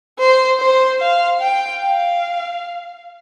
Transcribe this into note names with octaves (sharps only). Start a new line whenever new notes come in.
C5
C5
F5
G5
F5